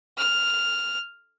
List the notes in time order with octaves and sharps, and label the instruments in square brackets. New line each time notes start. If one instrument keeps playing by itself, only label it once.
[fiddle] F6